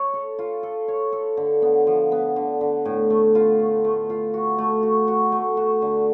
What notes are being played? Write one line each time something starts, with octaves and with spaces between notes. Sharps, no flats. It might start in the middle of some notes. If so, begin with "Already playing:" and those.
Already playing: C#5
A4
F4
A4
C#5
A4
D3
B3
F3
B3
D3
D3
A2
A3
F4
A3
A3
F4
F#4
A3
F#4
F#4
A3
F#4
D3